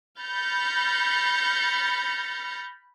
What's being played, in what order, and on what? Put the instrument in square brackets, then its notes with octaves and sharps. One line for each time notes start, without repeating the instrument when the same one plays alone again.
[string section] B5 F6 G6 A6 A#6 C#7